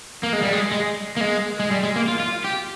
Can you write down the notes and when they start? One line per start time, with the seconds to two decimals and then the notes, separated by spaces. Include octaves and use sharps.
0.23 A#3
0.33 G#3
0.42 G3
0.53 G#3
0.71 G#3
1.17 A#3
1.21 G#3
1.60 G#3
1.71 G3
1.83 G#3
1.96 A#3
2.08 F4
2.20 F4
2.44 G4